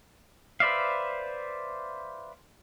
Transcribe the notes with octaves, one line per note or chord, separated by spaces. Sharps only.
B4 C5 D5 E5 F5